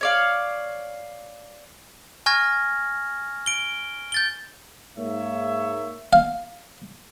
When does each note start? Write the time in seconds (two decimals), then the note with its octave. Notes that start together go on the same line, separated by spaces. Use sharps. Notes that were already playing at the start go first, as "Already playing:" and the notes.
0.01 C#5 D5 F5
2.26 G#5 C#6 F6 G#6 A#6
3.46 D7 G7
4.12 G6 A6 G7
4.98 G#2 A#3 C#5 E5
6.13 F5